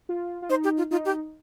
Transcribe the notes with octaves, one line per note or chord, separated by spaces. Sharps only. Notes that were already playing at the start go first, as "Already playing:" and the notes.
F4
F4
D#4 C5
G4
F4
D#4 F4
G4